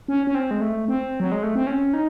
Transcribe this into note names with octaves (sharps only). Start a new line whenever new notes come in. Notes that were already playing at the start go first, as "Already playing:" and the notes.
C#4
C#4
C4
G#3
A3
C4
F#3
G#3
A3
C4
C#4
D#4